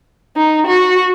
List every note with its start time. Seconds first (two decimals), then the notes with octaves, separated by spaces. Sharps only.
0.37 D#4
0.67 F#4